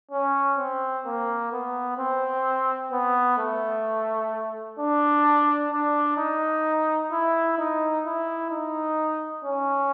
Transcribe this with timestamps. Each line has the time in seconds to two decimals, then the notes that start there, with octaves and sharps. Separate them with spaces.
0.11 C#4
0.58 C4
1.05 A#3
1.52 B3
1.98 C4
2.92 B3
3.38 A3
4.79 D4
5.72 D4
6.18 D#4
7.12 E4
7.59 D#4
8.06 E4
8.51 D#4
9.45 C#4